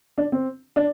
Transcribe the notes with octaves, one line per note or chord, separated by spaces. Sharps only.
D4
C4
D4